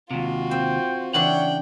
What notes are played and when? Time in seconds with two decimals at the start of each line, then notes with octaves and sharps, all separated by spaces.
0.11 D#2 C3 F4 F#4
0.51 C4 G5
1.14 C#3 E3 D4 C#5 F#5 G5